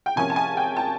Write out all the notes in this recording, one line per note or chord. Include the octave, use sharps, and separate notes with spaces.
G5
C3 F3 A#3 C#4 G#5
A5
G#5
G5
A5